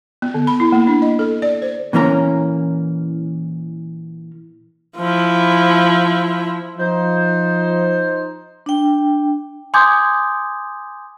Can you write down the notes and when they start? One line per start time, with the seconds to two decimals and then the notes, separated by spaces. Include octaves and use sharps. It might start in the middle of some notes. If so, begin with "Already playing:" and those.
0.22 B3
0.34 D3
0.47 B5
0.60 E4
0.72 A#3
0.87 D4
1.02 D#5
1.19 A4
1.42 D5
1.62 C5
1.93 A#2 E3 A#3 C#4 A#5
4.97 F3 E4
6.78 F3 D#4 C5
8.66 D4 G5
9.74 G#5 C6 D6 D#6 G6 G#6